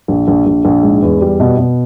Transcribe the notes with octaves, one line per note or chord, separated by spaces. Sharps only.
A#1
A#1
A#1
A#1
G#2
E2
G3
B2
B2